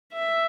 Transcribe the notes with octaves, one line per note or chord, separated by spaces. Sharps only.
E5